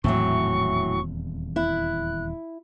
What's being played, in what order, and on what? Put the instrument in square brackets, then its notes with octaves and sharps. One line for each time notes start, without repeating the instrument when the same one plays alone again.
[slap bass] D#1 E2 C4 [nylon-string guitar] A2 E3 F#3 [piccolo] C#6
[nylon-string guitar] E4 [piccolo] F#6